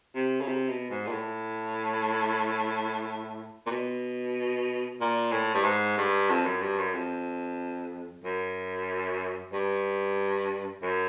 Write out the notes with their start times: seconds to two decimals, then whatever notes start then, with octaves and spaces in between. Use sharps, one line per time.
0.15 C3
0.41 C#3
0.48 C3
0.70 B2
0.90 G#2
1.07 A#2
1.12 A2
3.67 A#2
3.71 B2
5.01 A#2
5.32 A2
5.55 G2
5.64 G#2
5.98 G2
6.30 F2
6.46 F#2
6.61 G2
6.79 F#2
6.94 F2
8.24 F#2
9.53 G2
10.83 F#2